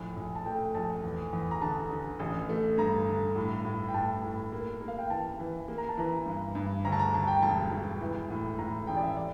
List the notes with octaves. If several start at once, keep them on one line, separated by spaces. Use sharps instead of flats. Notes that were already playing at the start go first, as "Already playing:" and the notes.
Already playing: A#1 A2
A#1
A5
A3 G5
A#1 A5
E2
E2
A#5
D3 A5
D3
A1
A3
G2 A#5
D3
A2
A2
G5
A2 A5
A2
A#3
A#3
F5
G5
E3 A5
E3
A#3
A#5
A5
E3 A#5
G2
G2
D2 A#5
A5
A#5
D2 A5
G5
E1 A5
E1
E3
A2
A2 A#5
A1 G5
D5
E5
D5